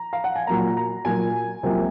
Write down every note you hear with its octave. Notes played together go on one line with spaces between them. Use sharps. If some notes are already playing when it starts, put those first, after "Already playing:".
Already playing: A#5
F5
F#5
G#5
A#2 F#3 A#3 A#5
A#5
A#2 F#3 A#3 G#5
C#2 C3 F#3 A#3